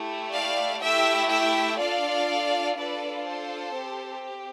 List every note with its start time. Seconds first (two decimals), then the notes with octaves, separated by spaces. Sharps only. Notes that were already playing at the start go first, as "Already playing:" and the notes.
Already playing: A3 E4 G4
0.32 D5 F5
0.80 A3 E4 G4 E5 G5
1.29 E5 G5
1.79 D4 F4 A4 D5 F5
2.76 D4 F4 A4 B4 D5
3.26 A4 C5
3.75 C4 G4